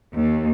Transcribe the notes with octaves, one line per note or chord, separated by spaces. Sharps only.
D#2